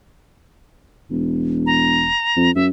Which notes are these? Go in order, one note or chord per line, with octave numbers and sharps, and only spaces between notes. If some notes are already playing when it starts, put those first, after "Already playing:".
E1
A#5
F2
F#2 E5